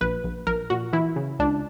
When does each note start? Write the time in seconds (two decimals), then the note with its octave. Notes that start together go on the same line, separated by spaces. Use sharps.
0.01 A#1 B4
0.24 A#1
0.47 A#1 A#4
0.70 A#2 F#4
0.93 E3 E4
1.16 C#3
1.39 C#2 D4